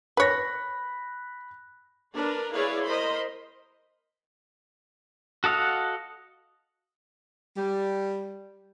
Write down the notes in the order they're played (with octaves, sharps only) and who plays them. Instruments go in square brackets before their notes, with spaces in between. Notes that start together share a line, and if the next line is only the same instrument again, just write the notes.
[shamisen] B4 C#5 [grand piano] B5 F#6 A#6
[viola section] D4 A#4 B4 D5
E4 G#4 B4 C#5 D5 F5
A#4 C5 D#5 B5 C6
[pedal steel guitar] F#4 A4 D#5 F5 F#5
[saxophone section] G3